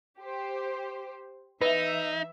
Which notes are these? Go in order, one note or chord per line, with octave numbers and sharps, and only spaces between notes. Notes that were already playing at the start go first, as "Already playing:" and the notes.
G4 C5
E3 D#4 B4 E5